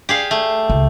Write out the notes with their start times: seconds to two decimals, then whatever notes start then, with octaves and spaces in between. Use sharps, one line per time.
0.09 G4 G#4 F5
0.31 A3
0.69 C#2